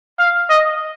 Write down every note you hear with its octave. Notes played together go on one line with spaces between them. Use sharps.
F5
D#5